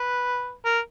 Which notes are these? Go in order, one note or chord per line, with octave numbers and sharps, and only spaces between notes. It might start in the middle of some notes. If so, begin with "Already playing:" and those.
Already playing: B4
A#4